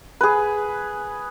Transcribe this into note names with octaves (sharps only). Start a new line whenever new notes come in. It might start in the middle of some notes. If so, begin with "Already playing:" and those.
G#4 B4